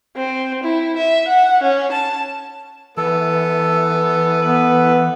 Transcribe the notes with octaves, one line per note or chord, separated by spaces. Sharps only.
C4
E4
E5
F#5
C#4
A5
E3 B3 A4
B3 B4